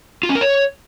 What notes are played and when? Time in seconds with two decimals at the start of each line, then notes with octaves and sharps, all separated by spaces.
0.23 F4
0.29 C#4
0.35 A#4
0.41 C#5